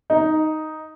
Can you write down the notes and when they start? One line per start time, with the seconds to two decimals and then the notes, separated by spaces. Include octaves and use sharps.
0.10 D#4